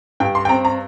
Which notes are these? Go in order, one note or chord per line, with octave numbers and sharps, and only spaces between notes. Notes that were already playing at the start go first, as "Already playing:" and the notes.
G2 G5
C6
G5
C4 A#5
A#5